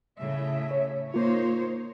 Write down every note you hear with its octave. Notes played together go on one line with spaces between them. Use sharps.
A2 C#3 E5
C#5
A#3 D#4 F4 C5 C#5